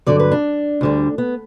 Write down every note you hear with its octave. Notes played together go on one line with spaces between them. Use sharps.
G2 D3 F#3 D5
B4
D4
D2 D3 G3
B3